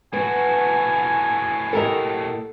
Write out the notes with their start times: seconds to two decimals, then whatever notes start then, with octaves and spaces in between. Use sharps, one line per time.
0.13 A2 B3 F#4 G#5
1.73 G4 A4 A#4 D#5